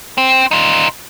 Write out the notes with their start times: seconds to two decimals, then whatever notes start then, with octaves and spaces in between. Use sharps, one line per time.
0.18 C4
0.51 D#4 F4